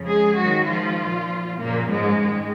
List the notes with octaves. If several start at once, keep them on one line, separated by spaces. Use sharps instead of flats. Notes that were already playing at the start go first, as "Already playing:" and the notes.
Already playing: F2 C#3 F3
G#3 G#4
G#2 D#3 F#3 F#4
F3 F4
A#2 F3
F#2 A#2 C#3 F3 A#3
G#2 G#3
G#2 D#3